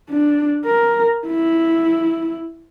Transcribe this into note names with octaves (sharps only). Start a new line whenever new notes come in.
D4
A#4
E4